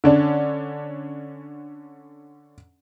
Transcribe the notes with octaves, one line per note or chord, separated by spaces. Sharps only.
D3 C#4 D4